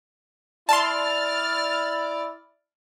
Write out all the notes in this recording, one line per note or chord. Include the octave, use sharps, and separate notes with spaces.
E4 D5 A5 C6 F6 A6